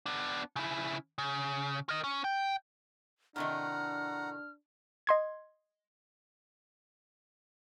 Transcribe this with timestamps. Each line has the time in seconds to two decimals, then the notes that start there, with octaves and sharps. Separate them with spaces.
0.06 B3 D4
0.56 C#3 E4
1.18 C#3
1.89 A#4 D#5
2.04 C#4
2.24 G5
3.36 A2 C3 D#3 D4 F#5 A#5 F6
5.07 D#5 C6 G#6